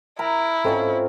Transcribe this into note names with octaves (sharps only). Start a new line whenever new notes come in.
E4 A#4 A#5 B5
G#2 C4 C#4 F4 A4 D#5